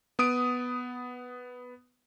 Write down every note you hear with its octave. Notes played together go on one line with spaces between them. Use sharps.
B3 D#6 D7